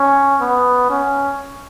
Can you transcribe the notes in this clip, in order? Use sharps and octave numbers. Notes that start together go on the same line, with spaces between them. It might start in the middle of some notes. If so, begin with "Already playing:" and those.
Already playing: C#4
B3
C#4